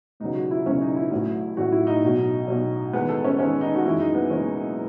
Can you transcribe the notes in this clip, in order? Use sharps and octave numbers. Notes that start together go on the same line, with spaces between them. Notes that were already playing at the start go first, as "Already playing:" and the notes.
E1 E2 C#3 F#3 D#4
F#4
E4
E1 E2 C#3 F#3 C#4
D#4
E4
A1 A2 F#3
A1 A2 F#3 F#4
E4
D#4
B1 B2 F#3
B1 B2 F#3
E2 D#3 G#3 B3
A4
C#4
E2 D#3 G#3 C#4
D#4
F#4
F#1 F#2 E3 G#3 E4
D#4
B3
F#1 F#2 E3 G#3 C#4